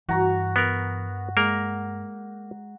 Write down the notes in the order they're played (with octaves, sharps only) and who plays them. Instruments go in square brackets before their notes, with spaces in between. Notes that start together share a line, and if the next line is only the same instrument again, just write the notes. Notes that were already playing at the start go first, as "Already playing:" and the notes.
[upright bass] G2 [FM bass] E3 [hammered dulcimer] F#4 A#5
[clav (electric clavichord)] B3 A#4
[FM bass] G#3 [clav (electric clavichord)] A#3 A#4